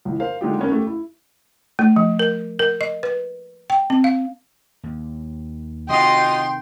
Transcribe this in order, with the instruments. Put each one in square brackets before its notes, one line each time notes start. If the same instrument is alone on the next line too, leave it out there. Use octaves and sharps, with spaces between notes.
[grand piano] C#2 E3
A#4 C5 F5
D3 G#3 D#4 F4 G4
B3 C#4 A#4
A3 G4
E4
[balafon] A3
F3
A#4
A#4
D#5
B4
G5
C4
F5
[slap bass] D#2
[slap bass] C3 D#3 [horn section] F4 F#4 D#5 [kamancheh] G5 C6